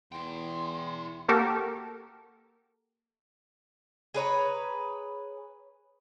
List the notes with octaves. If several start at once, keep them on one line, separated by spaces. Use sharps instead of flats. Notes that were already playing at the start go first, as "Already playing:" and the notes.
E2 E4 G5 C6
A#3 F#4 G4 A4 A#4
G#4 B4 C#5 A#5